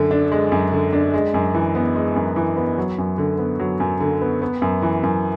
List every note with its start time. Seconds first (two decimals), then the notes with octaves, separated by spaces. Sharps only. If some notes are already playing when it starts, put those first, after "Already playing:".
Already playing: F#2 D3
0.11 D4
0.32 G#3
0.52 F#2
0.72 D3
0.93 D4
1.14 G#3
1.34 F#2
1.55 E3
1.75 B3
1.96 G#3
2.16 F#2
2.36 E3
2.57 B3
2.78 F#3
2.98 F#2
3.18 D3
3.38 B3
3.60 F#3
3.80 F#2
4.00 D3
4.21 B3
4.42 B3
4.62 F#2
4.82 E3
5.03 F#2